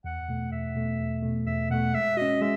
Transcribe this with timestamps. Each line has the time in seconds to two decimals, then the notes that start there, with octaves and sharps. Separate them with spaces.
0.04 E2 F#5
0.29 B2 A3
0.52 E2 E5
0.76 B2 A3
0.99 E2
1.23 B2 A3
1.46 E2 E5
1.70 B2 A3 F#5
1.94 G#3 E5
2.17 C#4 F#4 D#5
2.41 G#3 E5